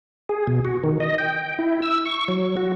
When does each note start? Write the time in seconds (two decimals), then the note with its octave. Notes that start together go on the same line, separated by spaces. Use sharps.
0.29 G#4
0.47 B2
0.65 F#4
0.84 D#3
1.00 D#5
1.18 G5
1.59 E4
1.82 E6
2.05 C#6
2.28 F#3
2.57 F#4